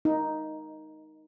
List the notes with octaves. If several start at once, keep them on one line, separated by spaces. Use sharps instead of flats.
D#4